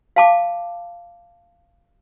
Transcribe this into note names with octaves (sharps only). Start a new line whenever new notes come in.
F5 A5 D6